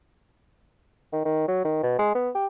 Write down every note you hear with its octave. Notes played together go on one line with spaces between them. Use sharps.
D#3
D#3
F#3
D#3
B2
G#3
B3
G4